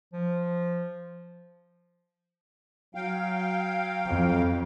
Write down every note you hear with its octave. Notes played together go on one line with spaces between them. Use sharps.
F3
F#3 F5 G5
F2